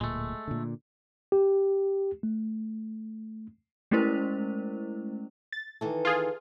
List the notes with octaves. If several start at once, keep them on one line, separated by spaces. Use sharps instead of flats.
D1 A#2 G#3 A3
A#2 D3
G4
A3
G#3 A3 C#4 E4 A#4 C5
A6
D#3 E3 A4
F4 G#4